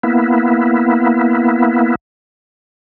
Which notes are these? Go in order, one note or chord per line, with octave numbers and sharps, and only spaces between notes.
A#3 B3 E4